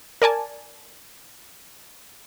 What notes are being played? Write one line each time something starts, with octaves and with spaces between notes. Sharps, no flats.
A#4 D5 G#5 A5